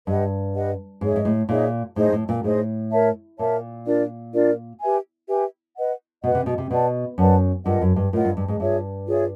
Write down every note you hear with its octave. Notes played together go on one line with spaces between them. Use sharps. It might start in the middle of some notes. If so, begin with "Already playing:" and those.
G2 G4 B4 D#5 F#5
G4 B4 D#5 F#5
G#2 D#4 G#4 C#5 E5
G#2
A2
A#2 D#4 G#4 C#5 E5
A2 D#4 G#4 C5 D#5
A2
A#2
A2 D#4 G#4 C5 D#5
A#4 C#5 E5 A5
A#2 A#4 C#5 E5 A5
D4 F4 A#4 D5
D4 F4 A#4 D5
G4 B4 E5 G#5
G4 B4 E5 G#5
B4 D#5 F#5
B2 B4 D#5 F#5
C3
B2
C3
B2 B4 D5 F#5 A5
F#2 B4 D5 F#5 A5
G2 F4 A#4 D#5 F#5
F#2
G2
A2 F4 A#4 D#5 F#5
G2
G2
G#2
G2 F4 G#4 C#5 E5
F4 G#4 C#5 E5